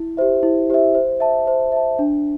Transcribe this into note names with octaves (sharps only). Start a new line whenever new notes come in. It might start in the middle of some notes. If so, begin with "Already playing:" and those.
Already playing: E4
G4 C5 E5
E4
G4 C5 E5
C5
E5 A5
C5
E5 A5
D4